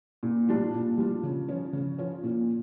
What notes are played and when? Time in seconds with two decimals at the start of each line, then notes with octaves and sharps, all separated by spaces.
0.23 A#2
0.48 G3 D4 F4
0.74 A#2
0.98 G3 D4 F4
1.23 C#3
1.48 F3 C#4 F4
1.73 C#3
1.98 F3 C#4 F4
2.23 A#2